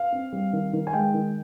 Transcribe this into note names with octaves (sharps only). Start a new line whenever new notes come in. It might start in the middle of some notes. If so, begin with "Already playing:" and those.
Already playing: F5
C4
G3
D#3
D#3
G#5
G#3 G5
D#3